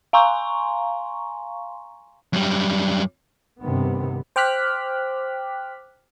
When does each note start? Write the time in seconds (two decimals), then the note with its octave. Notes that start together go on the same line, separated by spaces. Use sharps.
0.13 F5 G#5 A#5 C6 C#6
2.33 F#2 G3
3.59 G2 C3 D#3 B3
4.36 C5 G5 D6 F6 F#6 B6